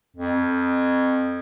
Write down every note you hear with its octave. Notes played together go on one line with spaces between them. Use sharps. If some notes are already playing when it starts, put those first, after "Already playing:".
F2